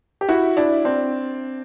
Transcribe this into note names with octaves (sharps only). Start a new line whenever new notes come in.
G4
E4 F#4
D4 E4
C4 D4